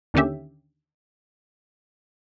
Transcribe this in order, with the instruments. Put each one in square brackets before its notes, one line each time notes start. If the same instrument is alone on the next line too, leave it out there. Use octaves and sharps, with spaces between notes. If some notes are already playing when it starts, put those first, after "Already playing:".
[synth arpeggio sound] D#2 D3 D#3 C#4 G4 E5